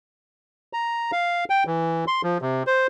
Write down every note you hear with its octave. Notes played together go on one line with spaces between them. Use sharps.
A#5
F5
G5
E3
C6
F3
C3
C5